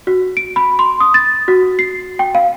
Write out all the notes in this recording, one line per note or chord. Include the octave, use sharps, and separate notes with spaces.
F#4
D7
B5
C6
D#6
A6
F#4
C7
G5
F5